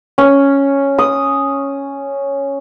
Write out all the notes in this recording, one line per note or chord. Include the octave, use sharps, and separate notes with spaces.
C#4
D#6